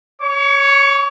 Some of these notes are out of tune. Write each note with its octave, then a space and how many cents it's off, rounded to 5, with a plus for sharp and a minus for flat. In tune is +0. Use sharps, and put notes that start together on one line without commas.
C#5 +0 C#6 +40